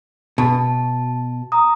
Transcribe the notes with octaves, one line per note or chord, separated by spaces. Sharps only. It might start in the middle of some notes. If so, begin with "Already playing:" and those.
B2 A5
A#5 D#6